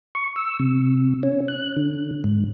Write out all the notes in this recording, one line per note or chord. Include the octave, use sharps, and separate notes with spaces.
C#6
E6
C3
C#4
F#6
D3
G#2